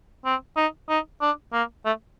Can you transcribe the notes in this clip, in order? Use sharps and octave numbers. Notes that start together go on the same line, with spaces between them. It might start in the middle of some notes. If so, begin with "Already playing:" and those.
C4
D#4
D#4
D4
A#3
A3